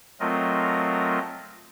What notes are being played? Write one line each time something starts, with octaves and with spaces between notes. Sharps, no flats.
F#3 A3 C4 F4 A#4 D#5